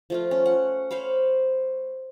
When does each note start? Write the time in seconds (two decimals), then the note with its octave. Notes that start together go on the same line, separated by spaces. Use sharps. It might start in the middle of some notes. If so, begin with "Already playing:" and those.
0.10 F3 A3 F4
0.31 C#4
0.46 F#5
0.91 C5 C#5 F5 B5